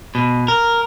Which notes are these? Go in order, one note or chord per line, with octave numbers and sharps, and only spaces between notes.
B2
A#4